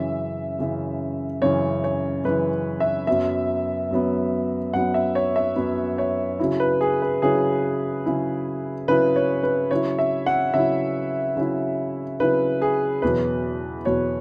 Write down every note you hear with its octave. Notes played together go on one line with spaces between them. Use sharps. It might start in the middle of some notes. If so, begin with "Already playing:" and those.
Already playing: F#2 C#3 E3 E5
F#2 C#3 E3
F#2 C#3 E3 C#5
C#5
F#2 C#3 E3 B4
E5
F#2 F#3 B3 E5
F#2 F#3 B3
F#2 F#3 B3 F#5
E5
C#5
E5
F#2 F#3 B3
C#5
C#3 F#3 E4
B4
G#4
B4
C#3 F#3 E4 G#4
C#3 F#3 E4
C#3 F#3 E4 B4
C#5
B4
C#3 F#3 E4 C#5
E5
F#5
C#3 F#3 E4 E5
C#3 F#3 E4
C#3 F#3 E4 B4
G#4
E2 B2 F#3 B4
E2 B2 F#3 C#5